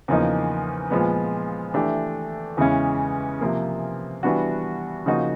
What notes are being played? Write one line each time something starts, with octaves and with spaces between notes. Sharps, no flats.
E2 C#3 F3 A#3 D#4
A#2 F3 G#3 B3
E3 A3 D4 G4
E2 C#3 E3 G#3 C#4
C3 F3 A#3
E3 G3 B3 D4 F#4
C#3 F3 A#3 D#4 F#4